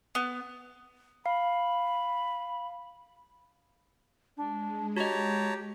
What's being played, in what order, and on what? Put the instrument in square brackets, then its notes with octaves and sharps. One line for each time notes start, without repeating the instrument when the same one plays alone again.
[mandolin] B3
[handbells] F5 [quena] B5
[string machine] G#3 [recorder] D4
[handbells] F#4 D#5 [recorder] G4 [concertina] C#5 A5 A#5